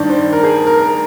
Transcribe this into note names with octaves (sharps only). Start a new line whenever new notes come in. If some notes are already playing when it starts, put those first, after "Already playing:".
Already playing: G2 D#3 D5
C5
A#4
G#4
A#4
A#4